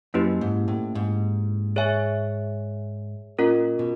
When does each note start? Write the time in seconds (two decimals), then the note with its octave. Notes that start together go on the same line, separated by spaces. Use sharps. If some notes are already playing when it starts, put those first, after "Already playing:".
0.14 F#2 A#3 C#4 E4 G4 B4
0.41 G#2
0.68 A2
0.95 G#2
1.76 G#4 C#5 E5 G#5
3.39 A#2 C#4 F4 A#4 D#5
3.79 B2